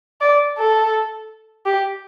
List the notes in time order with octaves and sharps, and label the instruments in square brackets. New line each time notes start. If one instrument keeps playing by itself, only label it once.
[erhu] D5
A4
G4